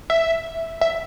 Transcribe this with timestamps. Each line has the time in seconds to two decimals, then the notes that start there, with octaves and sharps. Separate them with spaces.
0.10 E5
0.81 E5